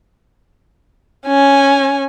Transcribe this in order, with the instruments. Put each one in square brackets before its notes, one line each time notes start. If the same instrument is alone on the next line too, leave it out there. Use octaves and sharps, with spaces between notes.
[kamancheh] C#4 G#5